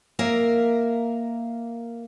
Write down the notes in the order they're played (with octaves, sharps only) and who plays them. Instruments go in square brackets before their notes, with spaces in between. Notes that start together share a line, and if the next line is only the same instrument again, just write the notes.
[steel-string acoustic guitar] A#3 A#4 E5 F5